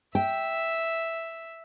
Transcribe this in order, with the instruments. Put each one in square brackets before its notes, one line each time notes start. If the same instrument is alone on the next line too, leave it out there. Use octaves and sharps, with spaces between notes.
[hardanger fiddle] E5 [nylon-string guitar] G5